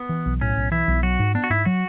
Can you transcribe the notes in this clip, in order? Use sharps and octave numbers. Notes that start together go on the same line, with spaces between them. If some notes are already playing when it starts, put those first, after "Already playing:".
Already playing: B3
E3
B1
A2 C#4
B1
E3 E4
B1
F#3 F#4
G#2
B3 D4
F#4
G#2 E4
F#3 F#4